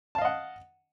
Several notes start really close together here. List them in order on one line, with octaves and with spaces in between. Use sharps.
A5 F5 D#5 F#5